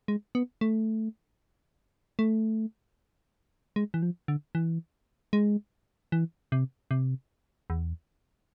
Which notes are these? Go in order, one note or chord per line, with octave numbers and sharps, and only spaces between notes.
G#3
B3
A3
A3
G#3
E3
F3
D3
E3
G#3
E3
C3
C3
E2